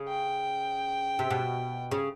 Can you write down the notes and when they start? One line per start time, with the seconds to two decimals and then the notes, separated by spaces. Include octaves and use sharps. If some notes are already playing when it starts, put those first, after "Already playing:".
Already playing: C#3
0.09 G5
1.19 C3
1.30 B2
1.91 C#3